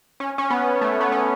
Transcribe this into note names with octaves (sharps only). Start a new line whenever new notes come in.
C#4
C#4
B3
A3
B3
C#4